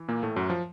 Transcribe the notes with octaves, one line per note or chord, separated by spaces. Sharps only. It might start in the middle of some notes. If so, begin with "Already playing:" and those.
Already playing: E3
A#2 A#3
A2 A3
F#2 F#3
F3